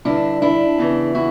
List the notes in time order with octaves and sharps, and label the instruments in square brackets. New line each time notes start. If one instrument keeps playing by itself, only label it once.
[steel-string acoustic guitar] G2 D3 D4 E4
D4 E4
E2 C#3 E3
E4 F#4